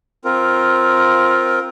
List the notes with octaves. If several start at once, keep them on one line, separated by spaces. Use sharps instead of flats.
C4 F4 A#4